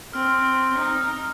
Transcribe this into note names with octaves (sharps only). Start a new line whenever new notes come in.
C4 F6
D#4
F6